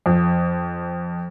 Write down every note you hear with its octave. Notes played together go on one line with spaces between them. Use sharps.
F2